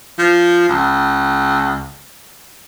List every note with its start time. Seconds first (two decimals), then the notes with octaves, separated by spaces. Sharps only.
0.19 F3
0.69 C#2